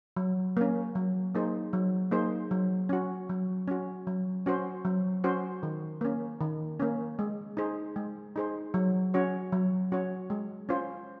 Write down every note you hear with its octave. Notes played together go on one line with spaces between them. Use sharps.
F#3
A#3 C#4
F#3
A#3 D#4 G#4 C5
F#3
A#3 D#4 G#4 C5
F#3
C#4 F#4
F#3
C#4 F#4
F#3
C#4 F#4 C5
F#3
C#4 F#4 C5
D#3
A#3 C#4
D#3
A#3 C#4
G#3
D#4 G#4 C5
G#3
D#4 G#4 C5
F#3
C#4 F#4 C#5
F#3
C#4 F#4 C#5
G#3
C#4 F4 C5